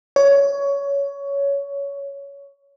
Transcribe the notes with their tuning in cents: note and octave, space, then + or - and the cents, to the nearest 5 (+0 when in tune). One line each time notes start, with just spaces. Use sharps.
C#5 +15